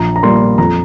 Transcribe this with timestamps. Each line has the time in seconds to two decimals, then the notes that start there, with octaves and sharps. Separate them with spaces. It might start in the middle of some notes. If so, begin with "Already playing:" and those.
Already playing: A#1 A#5
0.16 A#5
0.23 A#2 G3 A#3 C6
0.58 F2 A#5